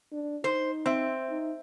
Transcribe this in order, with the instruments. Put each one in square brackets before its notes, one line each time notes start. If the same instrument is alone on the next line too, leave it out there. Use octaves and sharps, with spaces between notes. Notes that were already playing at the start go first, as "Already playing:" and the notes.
[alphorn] D4
[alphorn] D#4 [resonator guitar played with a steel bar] C5
[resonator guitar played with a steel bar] C4 [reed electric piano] C5 E5
[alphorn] D#4